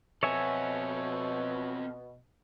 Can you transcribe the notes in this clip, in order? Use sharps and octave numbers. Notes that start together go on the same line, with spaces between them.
B2 C4 A4 C#5 E5 G#5